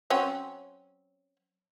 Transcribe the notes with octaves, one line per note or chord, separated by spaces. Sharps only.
F#3 C4 C#4